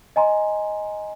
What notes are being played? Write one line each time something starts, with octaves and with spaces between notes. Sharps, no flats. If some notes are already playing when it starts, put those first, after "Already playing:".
D#5 G#5 A#5 C6